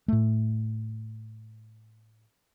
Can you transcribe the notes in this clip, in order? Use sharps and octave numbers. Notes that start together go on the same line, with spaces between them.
A2 A3